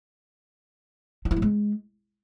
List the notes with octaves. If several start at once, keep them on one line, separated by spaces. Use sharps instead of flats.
D#4
E4
G3
G#3